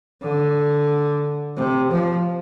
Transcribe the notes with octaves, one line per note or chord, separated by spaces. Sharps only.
D3
C3
F3